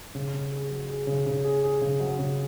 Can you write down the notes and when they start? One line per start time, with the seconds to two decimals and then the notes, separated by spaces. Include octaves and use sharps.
0.15 C#3
0.33 C#3
0.51 G#4
0.70 F#3
0.88 G#4
1.07 C#3
1.26 C#3
1.45 G#4
1.64 G#4
1.81 C#3
2.00 F#3
2.19 C#3